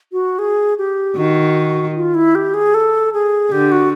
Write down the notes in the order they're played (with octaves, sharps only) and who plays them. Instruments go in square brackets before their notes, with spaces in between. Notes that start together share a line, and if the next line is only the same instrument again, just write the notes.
[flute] F#4
G#4
G4
[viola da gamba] D#3 [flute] F#4
[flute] F4
E4
G4
G#4
A4
G#4
[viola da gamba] D3 [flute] G4
[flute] F#4